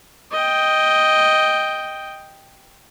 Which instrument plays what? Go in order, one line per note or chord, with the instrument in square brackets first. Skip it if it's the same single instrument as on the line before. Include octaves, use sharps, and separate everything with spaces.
[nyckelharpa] D#5 G5